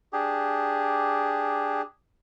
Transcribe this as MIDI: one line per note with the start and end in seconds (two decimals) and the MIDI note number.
0.13 1.82 62
0.13 1.82 67
0.13 1.82 68